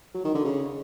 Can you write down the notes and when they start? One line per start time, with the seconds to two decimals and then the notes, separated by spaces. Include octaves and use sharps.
0.14 F#3
0.24 D#3
0.35 D3
0.45 C#3